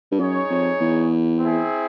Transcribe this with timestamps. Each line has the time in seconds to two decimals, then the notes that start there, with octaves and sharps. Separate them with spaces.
0.12 G2
0.19 F#2 D#4 G#4 C#5
0.50 F2
0.80 E2
1.39 C4 E4 G#4